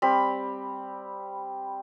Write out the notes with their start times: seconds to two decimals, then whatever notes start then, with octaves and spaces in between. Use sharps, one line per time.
0.02 G3 C4 B5